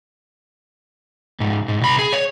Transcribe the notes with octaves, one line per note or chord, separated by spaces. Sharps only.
C#2 G#2
G#2
C2 B5
G#4
C#5